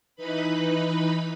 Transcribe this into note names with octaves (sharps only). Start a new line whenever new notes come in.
E3 D#4 B4 B5